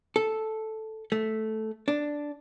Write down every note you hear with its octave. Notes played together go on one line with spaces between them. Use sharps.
A4
A3
D4